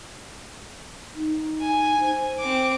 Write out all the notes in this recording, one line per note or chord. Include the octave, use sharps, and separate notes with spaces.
D#4
G#5
C5
C4 D6